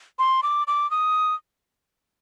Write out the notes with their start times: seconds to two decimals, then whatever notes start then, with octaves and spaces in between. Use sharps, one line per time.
0.19 C6
0.43 D6
0.67 D6
0.91 D#6